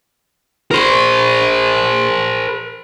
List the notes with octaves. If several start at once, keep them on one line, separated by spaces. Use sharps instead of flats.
A#4 C5